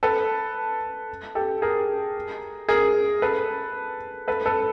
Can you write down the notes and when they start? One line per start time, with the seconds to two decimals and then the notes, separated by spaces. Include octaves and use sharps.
0.03 A4 B4
1.35 G4 A4
1.62 G#4 A#4
2.69 G#4 A#4
3.22 A4 B4
4.28 A4 B4
4.46 A4 B4